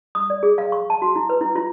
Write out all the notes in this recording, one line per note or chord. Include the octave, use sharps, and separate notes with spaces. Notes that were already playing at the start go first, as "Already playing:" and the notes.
D#6
D5
G#4
F5
C#6
A5
F#4
E4
B4
E4
F4